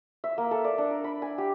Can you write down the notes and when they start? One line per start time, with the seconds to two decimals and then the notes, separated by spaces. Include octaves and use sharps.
0.24 E5
0.38 A#3
0.51 A4
0.64 D5
0.78 D4
0.91 A#4
1.04 B5
1.22 G#5
1.38 G4